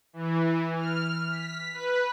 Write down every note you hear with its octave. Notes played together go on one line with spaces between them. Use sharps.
E3
F6
B6
B4